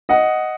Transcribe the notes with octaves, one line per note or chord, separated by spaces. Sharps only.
D#5 F#5